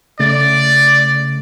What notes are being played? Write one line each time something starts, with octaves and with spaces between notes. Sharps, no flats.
C#3 A3 D5 A6